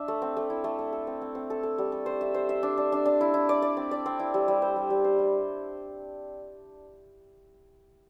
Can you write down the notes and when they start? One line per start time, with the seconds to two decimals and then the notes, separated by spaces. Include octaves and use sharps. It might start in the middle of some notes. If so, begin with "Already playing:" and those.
Already playing: D4 E5
0.08 A3
0.22 C4
0.37 A3
0.50 E4
0.64 A3
0.79 A3
0.93 A4
1.07 C4
1.22 C4
1.35 C4
1.50 A4
1.63 A4
1.78 G3
1.92 A4
2.06 C5
2.21 E5
2.34 C5
2.49 E5
2.63 D4
2.78 D4
2.92 D4
3.05 D4
3.21 E4
3.34 E4
3.49 D5
3.62 D5
3.77 C4
3.91 D5
4.06 C4
4.19 E4
4.34 G3
4.48 G3
4.62 C5
4.76 G3
4.90 G3
5.04 C5
5.19 G3